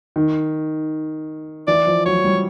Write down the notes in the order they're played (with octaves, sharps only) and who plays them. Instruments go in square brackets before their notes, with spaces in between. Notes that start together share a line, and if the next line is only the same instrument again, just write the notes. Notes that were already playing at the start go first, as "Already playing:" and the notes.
[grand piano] D#3
[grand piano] E3 [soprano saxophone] D5
[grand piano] F3
[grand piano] F#3 [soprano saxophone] C#5
[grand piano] G3